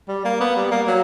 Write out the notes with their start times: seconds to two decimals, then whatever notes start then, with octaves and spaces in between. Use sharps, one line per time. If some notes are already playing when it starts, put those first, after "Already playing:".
0.08 G3
0.25 A#3
0.40 B3
0.56 G3
0.71 A#3
0.87 F#3